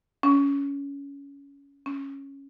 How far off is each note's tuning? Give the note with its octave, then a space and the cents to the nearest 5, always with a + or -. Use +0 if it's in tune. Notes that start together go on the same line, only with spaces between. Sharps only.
C#4 +20
C#4 -5